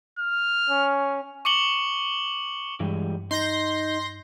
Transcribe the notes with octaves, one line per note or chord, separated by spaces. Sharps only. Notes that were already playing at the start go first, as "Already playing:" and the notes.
F6
C#4
C#6 D6 C#7 F#7 G7
G2 E3 G3 G#3
D#4 C6 G6 A#6